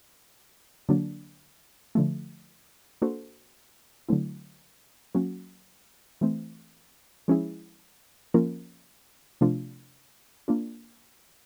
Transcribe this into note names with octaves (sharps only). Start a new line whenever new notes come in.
D3 F#3 A#3 D4
D3 F3 A3
A#3 D4 F#4 A4 C5
D3 F#3 A3 C4 E4
F#3 A#3 C#4 F#4
E3 A3 C4
F3 G#3 C#4 E4 G#4
F3 A#3 C#4 F4 A#4
C3 F3 A3 D4 F4
A#3 D4 F4